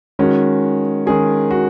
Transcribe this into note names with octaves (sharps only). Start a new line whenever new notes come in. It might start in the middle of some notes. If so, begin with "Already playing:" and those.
D#3 G#3 C#4 F#4
D#3 G#3 C#4 G#4
F#4